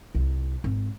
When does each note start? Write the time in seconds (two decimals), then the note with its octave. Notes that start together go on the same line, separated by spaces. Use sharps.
0.15 C2
0.64 G#1